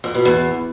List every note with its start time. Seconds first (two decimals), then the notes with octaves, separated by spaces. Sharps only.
0.04 F2
0.15 B2
0.25 E2